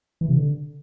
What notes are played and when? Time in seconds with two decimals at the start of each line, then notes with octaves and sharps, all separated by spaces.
0.21 E3
0.29 C3
0.36 D3